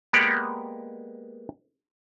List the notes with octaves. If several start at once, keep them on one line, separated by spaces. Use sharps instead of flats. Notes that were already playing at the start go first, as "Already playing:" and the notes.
G#3 A#3 B3 G4 D5 F#5